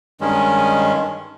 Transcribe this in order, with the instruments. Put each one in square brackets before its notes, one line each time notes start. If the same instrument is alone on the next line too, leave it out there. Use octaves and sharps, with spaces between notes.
[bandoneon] G2 D#3 G#3 C#4